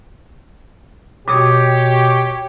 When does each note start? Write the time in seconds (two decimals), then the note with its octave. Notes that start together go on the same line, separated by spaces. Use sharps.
1.28 B2 G4 C#5 D6 D#6